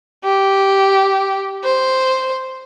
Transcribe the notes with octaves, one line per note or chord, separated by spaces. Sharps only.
G4
C5